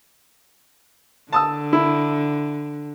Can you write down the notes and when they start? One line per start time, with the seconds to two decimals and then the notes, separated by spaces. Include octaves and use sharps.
1.32 D3 A5 D#6 E6
1.73 E4